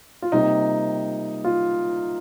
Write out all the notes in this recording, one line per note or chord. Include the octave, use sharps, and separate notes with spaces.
F4
C3 G3 A#3 D#4
F4